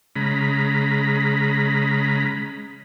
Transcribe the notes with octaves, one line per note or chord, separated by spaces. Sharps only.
C#3 G#3 A#5 B5